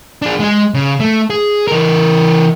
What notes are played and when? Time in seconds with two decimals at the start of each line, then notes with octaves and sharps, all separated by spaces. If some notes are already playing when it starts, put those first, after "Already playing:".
0.22 D4 G#4
0.40 G#3 G#4
0.74 C#3
1.00 A3
1.30 G#4
1.68 E3 A#4